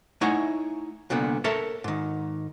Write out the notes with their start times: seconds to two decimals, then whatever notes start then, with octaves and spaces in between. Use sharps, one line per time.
0.21 A3 D#4 E4 C#5 F#5 G#5
1.10 C2 A#2 D3 B3
1.44 A4 A#4 C#5 E5 A5
1.84 G#2 D#3